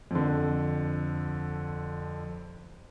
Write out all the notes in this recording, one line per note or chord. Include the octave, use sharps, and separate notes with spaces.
F2 D3